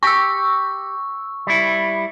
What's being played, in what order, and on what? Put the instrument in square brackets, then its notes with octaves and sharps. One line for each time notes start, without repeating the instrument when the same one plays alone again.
[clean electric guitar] G4 [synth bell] C#6 E6
[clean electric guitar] G3 E4